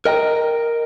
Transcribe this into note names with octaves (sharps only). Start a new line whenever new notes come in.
A#4 D#5 G5 A#5